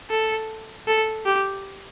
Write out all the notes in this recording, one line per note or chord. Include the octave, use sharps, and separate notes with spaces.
A4
A4
G4